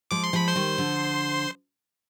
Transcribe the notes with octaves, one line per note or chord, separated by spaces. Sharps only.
F3 G#3 D6
C6
F3 G#3 B5
C5 C6
D#3 G3
D3 F3